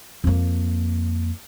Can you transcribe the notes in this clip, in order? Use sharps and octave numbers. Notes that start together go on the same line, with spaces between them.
F2 A#3